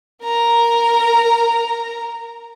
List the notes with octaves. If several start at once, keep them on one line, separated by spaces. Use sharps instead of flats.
A#4 A#5